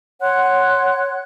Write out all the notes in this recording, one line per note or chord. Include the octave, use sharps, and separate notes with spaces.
C#5 F#5 C6 F#6